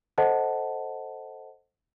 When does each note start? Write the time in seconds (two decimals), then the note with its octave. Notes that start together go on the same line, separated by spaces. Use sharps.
0.18 A4 C5 D#5 F#5 A5